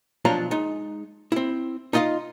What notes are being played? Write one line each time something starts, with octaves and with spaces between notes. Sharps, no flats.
B1 F3 F#3 D4 F4 A#5
G#3 D#4
C4 E4
D#4 F4 D#5 F5 C6